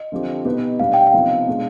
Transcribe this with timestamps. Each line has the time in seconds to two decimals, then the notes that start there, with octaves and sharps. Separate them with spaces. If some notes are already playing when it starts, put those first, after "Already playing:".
Already playing: D#5
0.12 D3 F3 C4 G4
0.45 B2 B3 D#4 G4 B4
0.79 B2 G3 D4 F5
0.94 G5
1.07 F5
1.13 C3 F3 B3 D#4
1.48 B2 G#3 D4